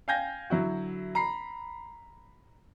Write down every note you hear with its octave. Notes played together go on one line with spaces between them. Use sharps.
F5 G5 G#5 G6 G#6 A#6
D3 F#3 E4 F#4
A#5 B5 C7